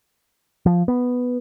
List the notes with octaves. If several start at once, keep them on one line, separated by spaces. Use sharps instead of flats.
F3
B3